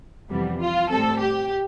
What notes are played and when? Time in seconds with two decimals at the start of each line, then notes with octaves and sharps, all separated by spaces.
0.29 F2 C3 E3 G3 B3
0.59 F4
0.90 A2 G3 C4 A4
1.19 G4